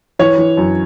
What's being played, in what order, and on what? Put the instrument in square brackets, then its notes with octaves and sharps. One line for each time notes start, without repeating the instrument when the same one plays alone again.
[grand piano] E3 C#5
E3
F#2